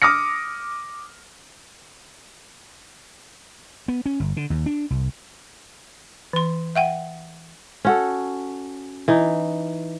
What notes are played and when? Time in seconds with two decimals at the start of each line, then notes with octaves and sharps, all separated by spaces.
0.02 D6 D#6 F6 A#6 C#7
3.88 B3
4.06 C#4
4.20 G1
4.37 D3
4.50 D#2
4.66 D4
4.90 C2
6.33 E3 C6
6.76 E5 F#5 G5
7.85 C#4 F#4 A4
9.08 E3 D#4